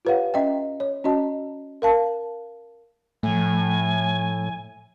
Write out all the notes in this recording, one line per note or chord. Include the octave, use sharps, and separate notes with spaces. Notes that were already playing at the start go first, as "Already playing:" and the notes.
F4 G4 B4 C#5 F5 F#5
C#4 D#5 E5 G5
C#5
C#4 F#4 D#5 A5
A#4 F5 A5
A2 F3 A3 G#5